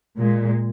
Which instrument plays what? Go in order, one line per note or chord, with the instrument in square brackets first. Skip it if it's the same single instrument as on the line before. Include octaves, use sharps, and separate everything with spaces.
[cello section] A#2 G#3